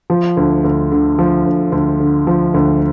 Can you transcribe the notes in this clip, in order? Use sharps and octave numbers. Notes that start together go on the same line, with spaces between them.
F3
D2
D2
D3
F3
D2
D2
D3
F3
D2